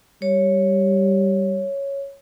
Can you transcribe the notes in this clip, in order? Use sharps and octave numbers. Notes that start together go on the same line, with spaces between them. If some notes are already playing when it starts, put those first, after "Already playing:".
G3 C#5